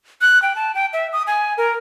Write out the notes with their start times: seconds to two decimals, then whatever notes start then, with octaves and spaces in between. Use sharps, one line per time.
0.21 F#6
0.42 G5
0.56 A5
0.75 G5
0.93 E5
1.13 D#6
1.27 G#5
1.58 A#4